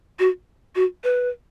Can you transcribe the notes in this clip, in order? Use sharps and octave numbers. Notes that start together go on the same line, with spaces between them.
F#4
F#4
B4